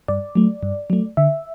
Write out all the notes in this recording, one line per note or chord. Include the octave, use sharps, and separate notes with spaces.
G2 D5
F#3 A3
G2
F#3 A3
D3 E5